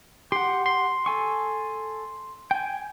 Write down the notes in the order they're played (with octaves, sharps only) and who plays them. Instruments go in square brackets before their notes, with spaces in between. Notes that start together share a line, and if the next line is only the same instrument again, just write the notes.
[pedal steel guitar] G4 F#5 [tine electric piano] C6
[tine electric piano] C6
[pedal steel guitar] A4 G#5 C#6
G5 G#5